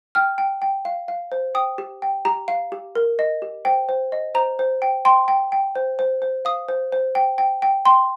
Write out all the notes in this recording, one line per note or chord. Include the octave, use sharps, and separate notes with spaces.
G5 F6
G5
G5
F5
F5
C5
G5 D#6
G4
G5
G4 A#5
F5
G4
A#4
D#5
G4
C5 G5
C5
D#5
C5 A#5
C5
G5
G5 C6
G5
G5
C5
C5
C5
F5 D#6
C5
C5
G5
G5
G5
G5 C6